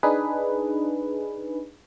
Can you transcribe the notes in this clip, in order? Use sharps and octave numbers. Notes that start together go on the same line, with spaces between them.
D4 D#4 G#4 B4